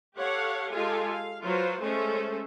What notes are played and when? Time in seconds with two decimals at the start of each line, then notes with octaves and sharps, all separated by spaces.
0.16 G4 A4 C#5 F5 F#5
0.73 G#3 F4 G4 A4 F5 G#5
1.09 F5
1.44 F#3 F4 B4 C5
1.80 G#3 A3 C#4 A4 C5